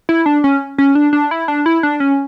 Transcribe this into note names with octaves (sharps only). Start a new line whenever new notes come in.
E4
D4
C#4
C#4
D4
D4
E4
D4
E4
D4
C#4